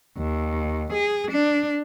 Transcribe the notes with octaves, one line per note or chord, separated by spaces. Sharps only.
D#2
G#4
D4